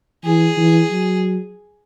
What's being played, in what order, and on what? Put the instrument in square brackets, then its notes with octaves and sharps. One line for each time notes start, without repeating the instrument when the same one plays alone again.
[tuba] E3 [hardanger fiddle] G#4
[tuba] E3
F#3